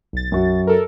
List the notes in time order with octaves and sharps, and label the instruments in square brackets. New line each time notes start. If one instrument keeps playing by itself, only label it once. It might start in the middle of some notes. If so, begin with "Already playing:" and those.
[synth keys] B1 A6
[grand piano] F#2 F#4
[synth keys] A4 A#4